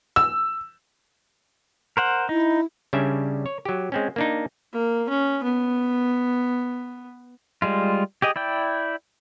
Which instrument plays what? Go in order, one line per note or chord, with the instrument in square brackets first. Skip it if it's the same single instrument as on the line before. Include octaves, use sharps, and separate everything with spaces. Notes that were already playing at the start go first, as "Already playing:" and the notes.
[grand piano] E6
[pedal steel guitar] A#4 C5 F#5
[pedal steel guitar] D#4 [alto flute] E4
[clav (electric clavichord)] C#3 G3 C#4 D4 E5
C#5
F#3 G4
G#3 C4 C#4
A#3 D4 D#4
[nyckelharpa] A#3
C#4
B3
[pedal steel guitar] G3 G#3 F4
G4 G#4 D#5
E4 D5 G5